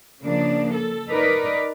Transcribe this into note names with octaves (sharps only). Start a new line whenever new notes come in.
C#3 F3 A#3 D4
A4
D#4 A#4 B4 D5